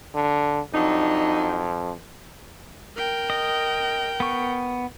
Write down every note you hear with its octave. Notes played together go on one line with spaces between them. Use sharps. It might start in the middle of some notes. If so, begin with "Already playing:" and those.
D3
F2 F#3 D4 D#4
A#4 G5
D#5
B3 C#6